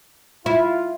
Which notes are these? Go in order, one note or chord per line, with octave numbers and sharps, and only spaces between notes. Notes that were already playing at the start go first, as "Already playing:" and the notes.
E4 F4